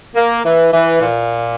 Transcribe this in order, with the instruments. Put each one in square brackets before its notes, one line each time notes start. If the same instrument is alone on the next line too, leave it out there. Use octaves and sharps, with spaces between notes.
[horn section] A#3
E3
E3
A#2